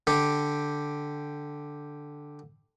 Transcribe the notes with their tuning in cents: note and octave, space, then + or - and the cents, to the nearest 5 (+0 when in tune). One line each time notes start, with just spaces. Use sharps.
D3 +0 G4 +0